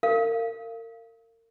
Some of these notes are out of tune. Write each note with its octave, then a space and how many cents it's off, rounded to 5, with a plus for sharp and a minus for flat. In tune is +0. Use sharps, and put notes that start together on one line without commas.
A#4 -40 F5 -20